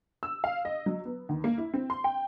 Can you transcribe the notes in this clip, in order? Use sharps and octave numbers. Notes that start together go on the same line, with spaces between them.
E6
F5
D#5
F#3
B3
D#2
A#3
E4
C4
C6
G5